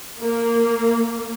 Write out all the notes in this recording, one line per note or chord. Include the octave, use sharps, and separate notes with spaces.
A#3